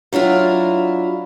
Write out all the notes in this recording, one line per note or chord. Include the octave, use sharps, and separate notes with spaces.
F#3 D4 E4 F4